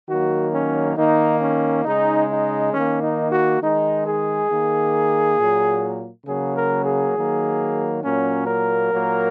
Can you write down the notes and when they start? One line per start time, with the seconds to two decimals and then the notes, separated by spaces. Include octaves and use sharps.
0.08 D#3 F#3 A#3 F#4
0.53 C#4
0.97 D#3 A#3 D#4
1.41 C#4
1.85 C#3 G#3 D#4
2.29 D#4
2.73 D#3 A#3 C#4
3.03 D#4
3.32 F#4
3.61 D#3 G#3 D#4
4.05 G#4
4.50 D#3 A#3
5.38 A#2 F#3 A#3
6.26 C#3 F#3 A#3 G#4
6.56 A#4
6.86 G#4
7.15 D#3 F#3 A#3
8.03 A#2 F#3 A#3 C#4
8.46 A#4
8.91 A#2 F#3 A#3